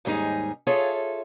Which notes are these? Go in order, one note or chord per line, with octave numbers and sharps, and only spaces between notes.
D#2 G#2 G3 D#4 G#4
F4 G#4 A4 C#5 E5